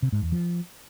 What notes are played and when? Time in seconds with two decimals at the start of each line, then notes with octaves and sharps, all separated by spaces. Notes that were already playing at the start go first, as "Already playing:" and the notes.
0.02 C3
0.12 G#2
0.22 E2
0.32 F3